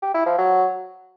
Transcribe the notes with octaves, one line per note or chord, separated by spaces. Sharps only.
G4
E4
F3
F#3